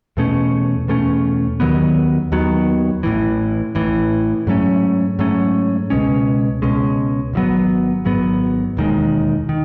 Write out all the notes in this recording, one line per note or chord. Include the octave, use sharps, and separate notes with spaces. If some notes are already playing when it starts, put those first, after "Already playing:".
E2 B2 A3 C#4
E2 B2 A3 C#4
D#2 D#3 F#3 B3
D#2 D#3 F#3 B3
A1 A2 E3
A1 A2 E3
G#2 F#3 A3 C#4
G#2 F#3 A3 C#4
C#2 B2 G#3 C#4
C#2 B2 G#3 C#4
G#1 G#2 F#3 B3
G#1 G#2 F#3 B3
E1 D#2 D#3 G#3
D#3